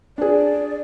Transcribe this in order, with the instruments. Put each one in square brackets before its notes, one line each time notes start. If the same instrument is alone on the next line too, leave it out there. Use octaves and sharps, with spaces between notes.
[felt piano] D4 G#4 [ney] D5